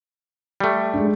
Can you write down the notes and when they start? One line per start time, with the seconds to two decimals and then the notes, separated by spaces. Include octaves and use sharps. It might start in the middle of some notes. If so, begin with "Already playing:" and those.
0.60 G3 A3
0.94 G#3 D4